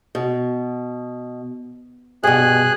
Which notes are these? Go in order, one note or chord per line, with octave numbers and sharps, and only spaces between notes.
B2
G2 B2 G#4 F#6